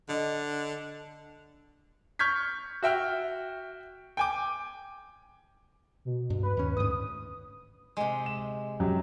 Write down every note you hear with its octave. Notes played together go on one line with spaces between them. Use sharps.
D3 D#5
C#6 F6 G6 G#6 B6
F#4 E5 G5 F6
G5 G#5 D6
B2
G2
B4
D#2 C#4
D2 G#2 D#6
C3 G#3
E7
F#2 F#3 G4